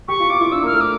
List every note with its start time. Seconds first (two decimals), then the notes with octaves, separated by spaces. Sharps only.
0.08 G4 C#6
0.19 F4
0.30 F4 D6
0.41 E4
0.52 D4 E6
0.62 A#3
0.66 F6
0.73 A3
0.81 D6